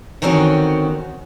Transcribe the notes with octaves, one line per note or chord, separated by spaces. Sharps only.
D3 D#3 C4 C#4 F4 F#4